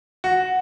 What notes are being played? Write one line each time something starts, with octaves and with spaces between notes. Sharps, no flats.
F#4